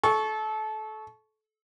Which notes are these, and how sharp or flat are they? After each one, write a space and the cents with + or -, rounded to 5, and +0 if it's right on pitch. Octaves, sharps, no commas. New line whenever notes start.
A4 -25 C#6 +0